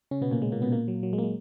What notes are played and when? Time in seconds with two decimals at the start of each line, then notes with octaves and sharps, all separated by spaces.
0.11 C#3 C#4
0.21 B2 B3
0.31 A#2 A#3
0.42 G#3
0.52 A#2 A#3
0.62 B2 B3
0.72 A#2 A#3
0.88 F#3
1.03 F#3
1.13 G#3
1.18 A#3
1.23 G#3